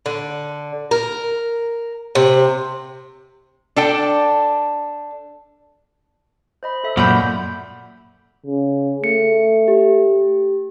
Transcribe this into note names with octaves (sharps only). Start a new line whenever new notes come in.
D3
A#4
C3
D4 A4 G5
C5 D#5 B5
A4 E5
F#2 A#2 F#5 B5 E6 G6 B6
C#3
A3 C#7
G4